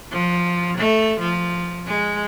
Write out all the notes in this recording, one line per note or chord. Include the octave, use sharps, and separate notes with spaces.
F3
A3
F3
G#3